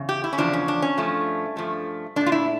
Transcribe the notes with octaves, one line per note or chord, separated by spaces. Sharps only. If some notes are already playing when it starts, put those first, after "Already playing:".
Already playing: E2 C#3
G4
E4
C#4
E2 C#3 F3 D4
C#4
D4
C#4
G2 F3 A3
G2 F3 A3
A#2 A3 D4
F4
E4